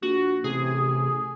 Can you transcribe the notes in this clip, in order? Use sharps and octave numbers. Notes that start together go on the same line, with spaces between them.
A#1 F#4
A1 C3 G#4